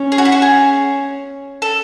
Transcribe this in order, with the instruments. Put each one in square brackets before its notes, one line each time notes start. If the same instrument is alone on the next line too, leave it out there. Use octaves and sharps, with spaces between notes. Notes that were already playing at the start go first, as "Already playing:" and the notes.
Already playing: [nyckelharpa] C#4
[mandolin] G#4
F#4
E4
F#4
G#4
A4